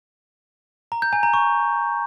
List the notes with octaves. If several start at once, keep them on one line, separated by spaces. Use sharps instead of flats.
A#5
G6
G#5
A#5
C#6